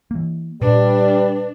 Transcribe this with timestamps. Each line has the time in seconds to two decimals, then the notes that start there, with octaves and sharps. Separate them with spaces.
0.11 E3 A#3
0.61 A#2 G3 D4 B4